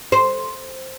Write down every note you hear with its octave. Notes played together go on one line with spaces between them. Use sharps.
C5